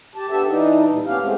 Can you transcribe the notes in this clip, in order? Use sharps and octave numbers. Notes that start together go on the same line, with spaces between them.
G4 A5
B3 D4 G4 A4 E5
E3 D4 D#4
A#2 G3
D#2 B3 C#4 G4 F5
G#3 A3 C4